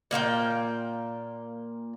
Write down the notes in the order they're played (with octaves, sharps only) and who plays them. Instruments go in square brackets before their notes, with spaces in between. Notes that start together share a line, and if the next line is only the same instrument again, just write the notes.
[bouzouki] A#2 A#3 F5 G5